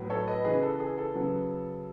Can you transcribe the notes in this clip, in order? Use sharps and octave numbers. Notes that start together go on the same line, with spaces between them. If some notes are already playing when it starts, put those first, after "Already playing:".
Already playing: A2 F#3 B3
A4 C#5
B4 D#5
C#3 E3 B3 G#4 B4
A4
G#4
A4
C#3 F#3 B3